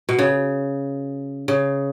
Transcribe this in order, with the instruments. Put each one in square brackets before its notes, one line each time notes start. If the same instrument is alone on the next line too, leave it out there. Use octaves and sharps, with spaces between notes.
[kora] B2
C#3
C#3